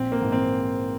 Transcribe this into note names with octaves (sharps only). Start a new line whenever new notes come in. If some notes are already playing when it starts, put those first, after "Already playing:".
Already playing: A#1 C4
A#3
G#2 E3
C4